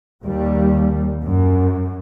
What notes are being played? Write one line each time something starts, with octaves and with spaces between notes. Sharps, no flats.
D#2 G3
F#2